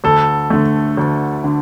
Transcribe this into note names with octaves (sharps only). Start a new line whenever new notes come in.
D2 A4
D3 A3
D2
D3